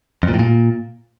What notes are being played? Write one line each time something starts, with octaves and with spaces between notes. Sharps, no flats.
F2
A#2
A2
A#2